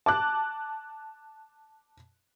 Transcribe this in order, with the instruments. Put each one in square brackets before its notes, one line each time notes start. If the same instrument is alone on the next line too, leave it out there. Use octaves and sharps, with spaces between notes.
[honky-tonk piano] A5 D6 F#6